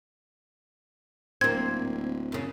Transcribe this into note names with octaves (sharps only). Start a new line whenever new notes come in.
D1 A#3 C4 G#6
F#2 C#3